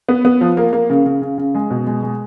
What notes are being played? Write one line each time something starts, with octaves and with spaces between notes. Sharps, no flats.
B3
B3
F3
A#3
A#3
C#3
C#3
C#3
C#3
G#3
B2
G#3
G#3